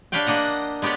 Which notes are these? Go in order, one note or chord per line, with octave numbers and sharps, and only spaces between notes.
D4 G4 B4 C#5 F5 G5
A#3 D4 D#5 F#5
G#3 B3 G4 C#5 D5